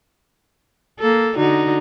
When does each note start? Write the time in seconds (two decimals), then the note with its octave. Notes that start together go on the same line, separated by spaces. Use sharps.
0.99 A#3 A4
1.35 D3 D#4 F#4